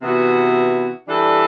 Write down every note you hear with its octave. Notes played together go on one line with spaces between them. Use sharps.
C3 E3 B3 F#4
E3 G3 D4 A4